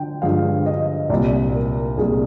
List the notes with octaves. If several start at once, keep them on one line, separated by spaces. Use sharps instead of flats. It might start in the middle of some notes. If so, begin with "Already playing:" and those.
Already playing: D3 G5
G2 D3 F3 G#3 F5
D#5
C2 A#2 G3 D5
A#4
C2 A#2 G3 G#4